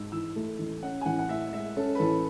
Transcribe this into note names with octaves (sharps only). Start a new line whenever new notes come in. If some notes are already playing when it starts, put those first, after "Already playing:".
Already playing: G#2 E6
E3 E6
A3
A1
C#4 F#5
G#5
A1 F#5
F#5
A2 E5
G#3 E5
C#4 A4
B4
A1 A4